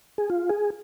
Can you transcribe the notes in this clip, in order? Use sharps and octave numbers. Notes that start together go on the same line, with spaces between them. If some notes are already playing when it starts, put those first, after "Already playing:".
G#4
F4
G#4